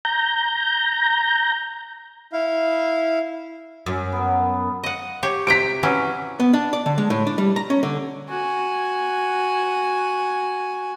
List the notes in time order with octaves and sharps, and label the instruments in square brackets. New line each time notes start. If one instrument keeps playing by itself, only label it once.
[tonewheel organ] A#5 G6
[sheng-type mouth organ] E4 F5
[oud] F#2
[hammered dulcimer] B3 A#4
[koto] D#5 F#5
G4 C#5
[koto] C3 G5 A#5 [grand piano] B6 D7
[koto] E3 F#3 C#4
[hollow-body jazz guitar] B3
D4
D5
D3
G#3
A2
D4
G3
A#5
C#4
D3
[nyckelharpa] F#4 G#5